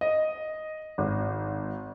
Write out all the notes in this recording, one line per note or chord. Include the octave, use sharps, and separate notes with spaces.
D#5
G#1